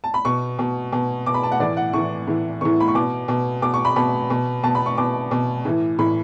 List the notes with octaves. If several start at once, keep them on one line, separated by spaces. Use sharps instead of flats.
A5
B5
B2 C#6
B2
B2
B2 D6
B5
A5
F#5
A2 E3 D5
F#5
A2 E3 C#6
A2 E3
A2 E3 C#6
B5
C#6
B2 D6
B2
B2 D6
C#6
B5
B2 B5
B2
B2 A5
B5
C#6
B2 D6
B2
A2 E3
A2 E3 B5